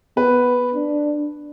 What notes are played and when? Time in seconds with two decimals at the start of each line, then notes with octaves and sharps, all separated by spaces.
0.17 B3 B4
0.74 D4